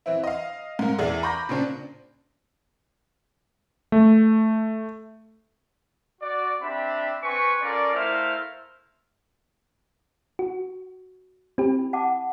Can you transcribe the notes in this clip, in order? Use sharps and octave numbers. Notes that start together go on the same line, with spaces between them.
E3 C4 E4
D#5 F5
G#2 A#4
E2 G#4 D5
A#5 B5 C#6 D6 G6 A#6
A#2 C#3 C4 D4
A3
F#4 D5
C4 D4 G4 E5 B5
C4 B4 G#5 C#6
C#4 F4 A4 A#4 D5
A3 E4 A#4 C5 E5 F5
F#4
C4 E4 G4 B5
F#5 A5 D6